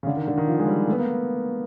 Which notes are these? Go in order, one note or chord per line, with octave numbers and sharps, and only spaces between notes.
C#3
D3
D#3
D3
D#3
F3
G#3
G3
A3
B3
A#3